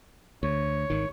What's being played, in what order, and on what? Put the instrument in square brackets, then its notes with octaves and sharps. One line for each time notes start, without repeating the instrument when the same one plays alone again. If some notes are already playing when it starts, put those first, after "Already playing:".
[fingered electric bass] D2 [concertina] C#5
[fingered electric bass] G#1 D#3